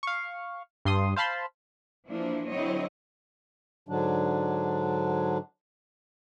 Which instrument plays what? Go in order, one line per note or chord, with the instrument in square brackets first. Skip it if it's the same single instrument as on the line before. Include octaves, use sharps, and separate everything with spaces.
[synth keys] F5 C#6
G2 C6 D#6
C5 F5 A5 B5 C6
[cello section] E3 F3 A#3 D4 E4
D3 F#3 C4 E4 C#5 D#5
[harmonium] G#2 D3 F#3 D4